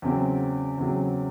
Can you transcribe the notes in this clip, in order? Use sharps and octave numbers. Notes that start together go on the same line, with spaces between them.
E2 C#3 F#3 C4
E2 C#3 F#3 C4